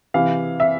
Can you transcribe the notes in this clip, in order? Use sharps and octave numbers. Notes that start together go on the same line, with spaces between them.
C3 E3 F5
E5